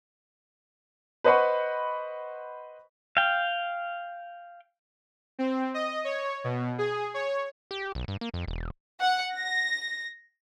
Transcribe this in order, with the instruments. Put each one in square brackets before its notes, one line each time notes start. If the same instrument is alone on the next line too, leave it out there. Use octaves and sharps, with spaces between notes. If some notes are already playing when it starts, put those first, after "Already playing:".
[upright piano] B4 C5 D#5 F#5 B5 C#6
[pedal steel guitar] F5 G5
[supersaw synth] C4
D#5
C#5
B2
G#4
C#5
[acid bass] G4
B1
G2
A#3
F2
E1
[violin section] F#5
A#6